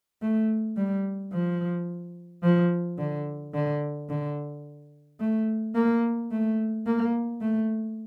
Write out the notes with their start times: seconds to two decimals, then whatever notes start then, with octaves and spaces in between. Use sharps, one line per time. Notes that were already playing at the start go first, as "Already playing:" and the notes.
0.22 A3
0.76 G3
1.33 F3
2.43 F3
2.98 D3
3.54 D3
4.09 D3
5.20 A3
5.75 A#3
6.31 A3
6.86 A#3
7.41 A3